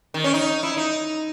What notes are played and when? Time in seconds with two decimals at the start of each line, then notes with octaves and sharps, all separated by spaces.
0.14 D#3
0.24 C#4
0.34 D#4
0.63 E4
0.77 D#4